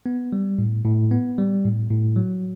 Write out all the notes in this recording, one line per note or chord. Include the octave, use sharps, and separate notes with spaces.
B3
G3
A2
A2
B3
G3
A2
A2
F#3